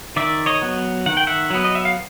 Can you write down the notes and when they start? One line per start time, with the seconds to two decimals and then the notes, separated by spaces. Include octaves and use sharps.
0.16 D#3 D5 E5
0.46 C#5 D#5
0.62 F#3 B3
1.06 D#3 F#5
1.17 G5
1.27 E5 F#5
1.50 F#3 B3
1.64 D#5
1.75 E5
1.85 F5